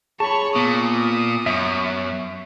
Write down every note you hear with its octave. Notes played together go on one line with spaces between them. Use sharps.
G#4 C#5 A5 B5 C#6
A#2 B3 D#6
F#2 E5 C#6